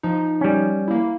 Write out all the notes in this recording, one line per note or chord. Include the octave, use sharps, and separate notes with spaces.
F3 D#4
G3 C#4
A#3 E4